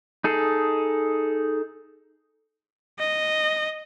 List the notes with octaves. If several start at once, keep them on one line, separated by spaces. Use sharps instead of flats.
D#4 G#4 A4
D#5